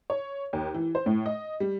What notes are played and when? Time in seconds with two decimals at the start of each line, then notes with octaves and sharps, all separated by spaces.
0.10 C#5
0.53 D#2
0.74 E3
0.95 C5
1.06 A2
1.26 D#5
1.60 G3